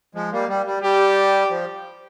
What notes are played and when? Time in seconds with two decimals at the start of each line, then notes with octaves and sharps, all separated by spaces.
0.15 F3 G#3
0.32 G3 A#3
0.49 G3
0.66 G3
0.83 G3 G4
1.50 F3